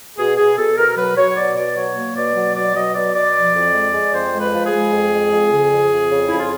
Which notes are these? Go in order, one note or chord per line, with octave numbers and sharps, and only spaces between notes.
B2 G#4
B2 G#4
B2 A4
B2 A#4
F#3 B4
F#3 C#5
B2 D5
B2 D5
F#3 C#5
A#3
B2 D5
F#3
B2 D5
F#3 D#5
B2 D5
B2 D5
F3
F2
G#3
G#3
F2 C5
G#3
B4
F3
G#4
G#3
F2
G#3
F2
C#3
F2
F2
C#3
F2 E4
F4